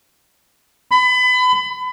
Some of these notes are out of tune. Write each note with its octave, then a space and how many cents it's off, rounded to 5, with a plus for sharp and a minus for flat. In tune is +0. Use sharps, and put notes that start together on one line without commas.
B5 +30